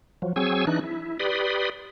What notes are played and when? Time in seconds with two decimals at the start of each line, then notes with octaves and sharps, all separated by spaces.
0.22 F3 F#3
0.36 F#3 C4 G#4 G#5 C#6 E6
0.67 E3 D4 D#4 F#6
0.84 E4
1.20 G4 B4 D5 B5 C6 D#6